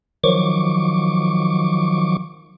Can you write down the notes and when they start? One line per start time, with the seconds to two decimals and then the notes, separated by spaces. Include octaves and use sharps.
0.24 D#3 F3 F#3 C#6 D6